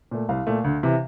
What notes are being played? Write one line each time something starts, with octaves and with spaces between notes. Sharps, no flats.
A#2 A3
C2 F5
A#2 A3
D2
C3 E3